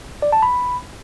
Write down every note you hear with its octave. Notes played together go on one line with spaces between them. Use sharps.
D5
A5
B5